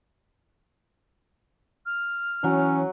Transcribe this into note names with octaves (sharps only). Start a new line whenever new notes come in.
F6
E3 F#3 C#4